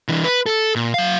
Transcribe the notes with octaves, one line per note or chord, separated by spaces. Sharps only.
E3 D4
B4
A4
A#2
F#3 F5